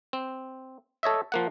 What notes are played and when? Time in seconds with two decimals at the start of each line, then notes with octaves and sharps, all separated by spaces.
0.13 C4
1.03 A4 C#5 D#5 E5
1.32 F3 A#3 F#5